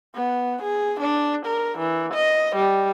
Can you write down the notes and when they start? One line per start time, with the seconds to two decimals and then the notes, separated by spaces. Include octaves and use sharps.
0.15 B3
0.63 G#4
1.00 D4
1.46 A#4
1.78 E3
2.14 D#5
2.56 G3